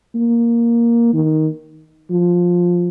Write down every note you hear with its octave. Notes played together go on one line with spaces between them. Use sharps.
A#3
D#3
F3